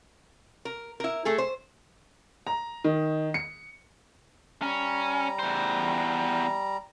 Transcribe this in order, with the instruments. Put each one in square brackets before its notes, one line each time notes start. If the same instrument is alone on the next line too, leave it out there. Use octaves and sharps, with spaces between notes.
[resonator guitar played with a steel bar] A#4
E4 A#4
A3 G#4 A4
C5
[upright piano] A#5
D#3
C#7
[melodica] G3 A#5 [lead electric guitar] C#4
[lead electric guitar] E2 C5